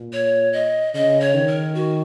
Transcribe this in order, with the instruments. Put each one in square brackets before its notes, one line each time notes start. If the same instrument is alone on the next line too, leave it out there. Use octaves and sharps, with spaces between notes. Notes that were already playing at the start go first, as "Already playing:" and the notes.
Already playing: [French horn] A#2
[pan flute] C#5
D#5
[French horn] C#3 [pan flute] D#5
[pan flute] C#5
[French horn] D#3
[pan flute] A#4
F#4